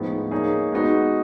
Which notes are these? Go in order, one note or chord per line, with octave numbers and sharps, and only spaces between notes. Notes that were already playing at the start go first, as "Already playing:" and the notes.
Already playing: A2 F3 G#3 B3 D#4
A#3 D#4 G#4 C#5
G#3 B3 D#4 F#4